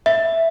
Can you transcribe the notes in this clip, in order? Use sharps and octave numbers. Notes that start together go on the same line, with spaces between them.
E5